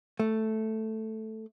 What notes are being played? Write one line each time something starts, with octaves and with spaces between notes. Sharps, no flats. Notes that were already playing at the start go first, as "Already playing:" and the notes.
A3